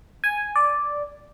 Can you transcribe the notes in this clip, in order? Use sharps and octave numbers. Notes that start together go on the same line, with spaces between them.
G#5
D5